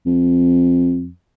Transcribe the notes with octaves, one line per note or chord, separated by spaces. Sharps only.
F2